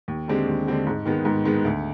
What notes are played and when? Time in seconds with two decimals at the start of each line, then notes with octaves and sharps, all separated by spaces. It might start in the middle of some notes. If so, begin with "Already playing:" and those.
0.08 D#2
0.28 D3 G#3 C4 G4
0.48 D#2
0.67 D3 G#3 C4 G4
0.87 G#2
1.06 D#3 G#3 B3
1.25 G#2
1.45 D#3 G#3 B3
1.65 D2